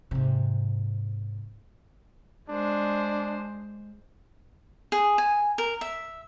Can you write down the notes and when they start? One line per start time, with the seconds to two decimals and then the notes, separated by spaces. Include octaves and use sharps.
0.11 G#2 C3
2.49 G#3 D4 C5
4.92 G#4
5.18 G#5
5.58 A#4
5.81 E5